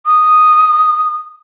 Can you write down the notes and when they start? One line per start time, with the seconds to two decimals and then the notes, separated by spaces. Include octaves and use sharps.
0.06 D#6